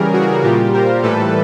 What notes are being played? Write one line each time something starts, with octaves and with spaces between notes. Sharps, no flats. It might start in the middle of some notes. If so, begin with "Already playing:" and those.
Already playing: C#3 E3 G3 G#4 A#4
F#4 G#4
A#2 G3 F4 G4
A#4 C5
A2 E3 G3 A4 B4